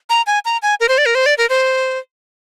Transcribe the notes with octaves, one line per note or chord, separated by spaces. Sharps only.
A#5
G#5
A#5
G#5
A#4
C5
D5
A#4
C5
D5
A#4
C5